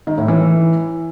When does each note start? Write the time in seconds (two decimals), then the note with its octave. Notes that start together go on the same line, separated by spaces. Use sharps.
0.07 D#3
0.18 A2
0.28 E3